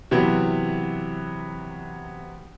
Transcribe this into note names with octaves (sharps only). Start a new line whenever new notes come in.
C3 E3 F#3 B3